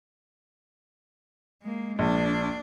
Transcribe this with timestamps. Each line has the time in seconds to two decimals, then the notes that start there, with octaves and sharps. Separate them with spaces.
1.62 G#3 A#3
1.99 A#1 D4